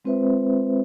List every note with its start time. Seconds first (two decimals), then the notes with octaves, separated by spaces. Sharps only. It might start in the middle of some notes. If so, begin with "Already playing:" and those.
0.05 G#3 C4 F4 B4 C5 E5